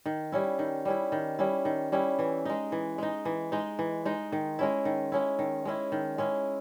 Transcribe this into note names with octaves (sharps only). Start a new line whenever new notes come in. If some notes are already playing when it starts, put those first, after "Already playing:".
D#3
G3 C#4 E4
D#3
G3 C#4 E4
D#3
G3 C#4 E4
D#3
G3 C#4 E4
E3
G#3 D#4
E3
G#3 D#4
E3
G#3 D#4
E3
G#3 D#4
D#3
G#3 C#4 E4
D#3
G#3 C#4 E4
D#3
G#3 C#4 E4
D#3
G#3 C#4 E4